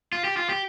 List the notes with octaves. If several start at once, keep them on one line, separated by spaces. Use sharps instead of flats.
F4
G4
F4
G4